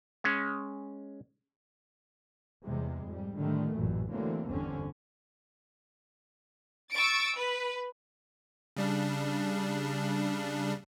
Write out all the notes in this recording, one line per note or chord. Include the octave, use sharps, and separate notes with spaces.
G#3 C#4
E2 C3 G3 G#3
F2 G#2 G3
A2 D3 D#3 G3 A3
A1 F#2 A#2 E3
D3 E3 F#3 A3 A#3 C4
G1 E2 G2 D3 C4 C#4
C#6 E6 A6 D7
B4
C#3 G3 D4